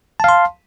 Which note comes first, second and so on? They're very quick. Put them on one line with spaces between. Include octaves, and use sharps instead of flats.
A5 F5 C6